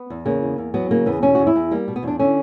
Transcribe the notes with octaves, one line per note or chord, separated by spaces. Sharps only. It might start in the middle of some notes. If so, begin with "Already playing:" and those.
Already playing: B3
E2
C#3 A#3
E2
E2
F#3 B3
C#3 A#3
E2 B3
B2 C#4
E2 F#4
E4
E2
G3 A#3
B2
B3
E2 D4
D3 C#4